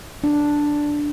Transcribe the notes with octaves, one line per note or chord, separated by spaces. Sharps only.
D4